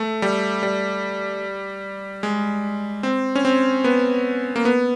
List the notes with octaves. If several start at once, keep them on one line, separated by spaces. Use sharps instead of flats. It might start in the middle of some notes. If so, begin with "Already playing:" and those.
Already playing: A3
G3
G3
G#3
C4
C#4
C4
B3
A#3
B3